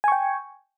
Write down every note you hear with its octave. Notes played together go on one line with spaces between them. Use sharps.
G5 G#5 C#6